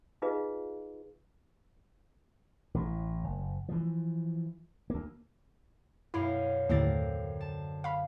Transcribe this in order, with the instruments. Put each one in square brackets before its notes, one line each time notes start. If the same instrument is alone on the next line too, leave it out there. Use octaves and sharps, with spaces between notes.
[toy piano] D#4 F4 G#4 B4 D#5 F5
[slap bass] A1 A2
F#1
E3 F3
D2 A#3
[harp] B1 F#2 F5 [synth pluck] E4
[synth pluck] D#2 A2 A6 [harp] D3 C4 A#4
[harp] A5
[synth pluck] F5 B5